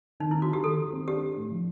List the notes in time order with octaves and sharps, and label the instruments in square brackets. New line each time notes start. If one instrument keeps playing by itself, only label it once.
[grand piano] D#3 [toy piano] D#4
[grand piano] C4 [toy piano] E4
[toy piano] F#4
[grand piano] D#3 [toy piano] G4
[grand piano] D#3 [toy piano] A4
[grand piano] D#3
C4
[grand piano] D4 [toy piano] G4
[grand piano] D4
A2
F3